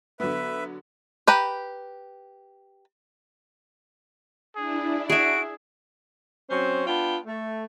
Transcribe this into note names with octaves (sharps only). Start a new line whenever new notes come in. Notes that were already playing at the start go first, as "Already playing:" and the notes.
D3 F#3 B3 B4 E5
G4 B4 A#5
D4 E4 G#4
F#4 G#4 E5 D7
F#3 C4 C#4 C5
B3 D4 F4 G5 A5
A3